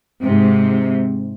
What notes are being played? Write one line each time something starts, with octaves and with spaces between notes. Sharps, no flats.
G#2 C3